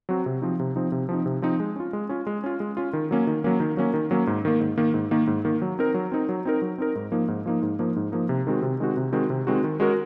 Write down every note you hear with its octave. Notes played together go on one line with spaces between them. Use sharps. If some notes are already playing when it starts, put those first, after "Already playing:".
F#3 C4 F#4
C3
F3 C4 D#4
C3
F3 C4 D#4
C3
F3 C4 D#4
C3
F3 C4 D#4
G#3
C#4 F4
G#3
C#4 F4
G#3
C#4 F4
G#3
C#4 F4
D#3
F#3 A#3 C#4
D#3
F#3 A#3 C#4
D#3
F#3 A#3 C#4
D#3
F#3 A#3 C#4
G#2
D#3 A#3
G#2
D#3 A#3
G#2
D#3 A#3
G#2
D#3 A#3
F#3
C4 D#4 A#4
F#3
C4 D#4 A#4
F#3
C4 D#4 A#4
F#3
C4 D#4 A#4
G#2
F3 A#3 D#4
G#2
F3 A#3 D#4
G#2
F3 A#3 D#4
G#2
F3 A#3 D#4
C3
D#3 G#3 C4 F#4
C3
D#3 G#3 C4 F#4
C3
D#3 G#3 C4 F#4
C3
D#3 G#3 C4 F#4
D#3
G#3 C#4 F#4 A#4